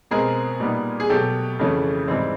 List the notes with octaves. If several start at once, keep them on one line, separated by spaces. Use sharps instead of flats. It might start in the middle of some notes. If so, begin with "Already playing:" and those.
B2 G#3 C4 G#4 A#4
A#2 G3 B3 D#4
G#4
B2 F#3 A3 G4 A4
F2 C#3 E3 A3 C#4
G#2 E3 G3 C4